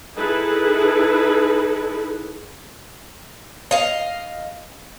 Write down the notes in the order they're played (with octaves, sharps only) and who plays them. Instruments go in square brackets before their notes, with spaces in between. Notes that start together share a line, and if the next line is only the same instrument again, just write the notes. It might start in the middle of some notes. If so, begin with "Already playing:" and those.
[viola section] D#4 E4 G#4 A4 B4
[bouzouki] D#5 F5